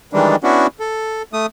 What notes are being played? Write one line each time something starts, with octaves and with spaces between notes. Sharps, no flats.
D#3 E3 G3 G#3 D4
B3 C#4 D4 E4 F#4
A4
A3 D#6